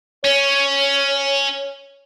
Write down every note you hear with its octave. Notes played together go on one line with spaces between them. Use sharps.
C#4 C#5